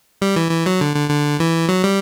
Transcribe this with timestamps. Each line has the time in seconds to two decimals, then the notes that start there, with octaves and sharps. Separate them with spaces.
0.22 G3
0.36 E3
0.51 E3
0.66 F#3
0.81 D3
0.95 D3
1.09 D3
1.40 E3
1.69 F#3
1.84 G3